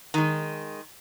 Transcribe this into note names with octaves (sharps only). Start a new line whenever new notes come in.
D#3 G#3